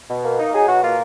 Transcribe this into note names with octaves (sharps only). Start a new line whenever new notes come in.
B2
A#3
D#4
F#3 G#4
B2 F#4
A#3 F4